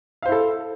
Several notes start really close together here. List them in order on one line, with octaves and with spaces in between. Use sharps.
F5 C5 E4 A4